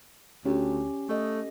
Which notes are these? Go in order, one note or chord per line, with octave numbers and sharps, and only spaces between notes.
D2 C#4 G4
A3 A4 D#5